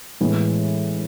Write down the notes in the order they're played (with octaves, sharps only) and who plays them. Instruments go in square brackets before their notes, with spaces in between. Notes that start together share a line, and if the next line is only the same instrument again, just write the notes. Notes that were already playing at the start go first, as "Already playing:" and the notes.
[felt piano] A2 E3 G#3 B3